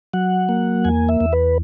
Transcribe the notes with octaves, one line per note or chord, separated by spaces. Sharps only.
F#3 F#5
A#3
E2 G#5
E5
E2
B4